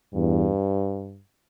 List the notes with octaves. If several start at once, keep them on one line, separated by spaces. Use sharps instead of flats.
E2 G2